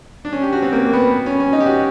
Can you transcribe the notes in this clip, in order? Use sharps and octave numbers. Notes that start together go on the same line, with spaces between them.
D4
C#4
G4
F#4
C4
A#3
B3
C#4
C#4
D#4
G4
F#4